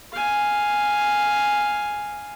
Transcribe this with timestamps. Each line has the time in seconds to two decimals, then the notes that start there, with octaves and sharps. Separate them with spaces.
0.12 F5 G#5